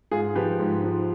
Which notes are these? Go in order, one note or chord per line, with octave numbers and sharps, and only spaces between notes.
G#2 F4 G#4
F3 G4 B4
G#2
F3